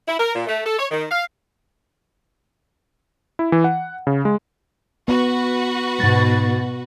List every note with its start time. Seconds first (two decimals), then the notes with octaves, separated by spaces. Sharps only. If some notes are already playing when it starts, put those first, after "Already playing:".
0.08 E4
0.20 A#4
0.35 A#2
0.47 A3
0.65 A4
0.79 C#5
0.91 D#3
1.11 F5
3.39 E4
3.52 E3
3.64 F#5
4.07 C#3
4.25 G#3
5.08 B3 F#4 B4
6.00 G#2 B2 A6